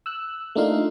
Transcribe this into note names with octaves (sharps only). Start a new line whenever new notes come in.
E6 F#6
A3 A#3 D4 D#4 F4 F5